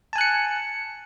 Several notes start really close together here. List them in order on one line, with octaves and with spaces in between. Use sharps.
A5 G#5 F#6 C#7